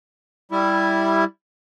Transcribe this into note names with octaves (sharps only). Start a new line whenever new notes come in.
G3 E4